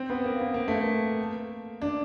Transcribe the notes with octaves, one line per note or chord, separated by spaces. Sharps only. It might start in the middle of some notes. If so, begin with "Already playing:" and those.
Already playing: C4
B3
A#3
B3
A#3
A3
A#3
D4